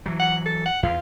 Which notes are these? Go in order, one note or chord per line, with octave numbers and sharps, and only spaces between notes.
E3 F#3
F#5
A4
F#5
E2 F4